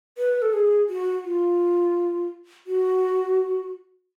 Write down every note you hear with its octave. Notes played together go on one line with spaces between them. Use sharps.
B4
A4
G#4
F#4
F4
F#4